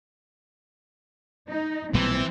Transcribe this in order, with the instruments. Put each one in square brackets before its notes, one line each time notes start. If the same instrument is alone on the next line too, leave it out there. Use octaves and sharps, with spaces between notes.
[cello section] D#4
[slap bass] B1 A#2 G3 [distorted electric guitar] E3 [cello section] C4